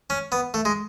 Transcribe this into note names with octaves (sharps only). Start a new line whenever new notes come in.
C#4
B3
A3
G#3